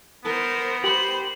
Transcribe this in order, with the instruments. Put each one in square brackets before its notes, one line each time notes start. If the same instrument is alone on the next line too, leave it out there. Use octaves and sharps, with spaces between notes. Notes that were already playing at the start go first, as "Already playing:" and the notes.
[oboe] B3 [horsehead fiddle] A#4 C5
[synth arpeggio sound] G4 B5 [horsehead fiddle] C5 [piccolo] F#7